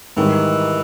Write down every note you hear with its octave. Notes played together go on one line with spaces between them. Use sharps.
G#2 D#3 E3 G3